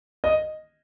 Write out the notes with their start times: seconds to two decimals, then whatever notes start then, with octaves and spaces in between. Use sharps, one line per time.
0.24 D#5